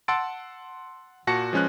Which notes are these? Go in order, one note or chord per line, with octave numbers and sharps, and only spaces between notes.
F#5 A5 C6 E6 A6 D7
A#2 F#4 A5 A#6 C#7
F3 G#3 C#4 B4 F#6